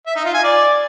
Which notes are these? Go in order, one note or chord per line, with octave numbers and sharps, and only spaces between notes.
E5
D#4
F4
G#5
D5